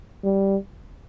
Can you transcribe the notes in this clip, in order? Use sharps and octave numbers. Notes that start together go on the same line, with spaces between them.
G3